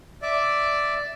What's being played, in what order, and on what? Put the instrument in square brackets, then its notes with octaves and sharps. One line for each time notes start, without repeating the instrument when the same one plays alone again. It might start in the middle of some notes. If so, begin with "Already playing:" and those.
[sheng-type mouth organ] D5 E5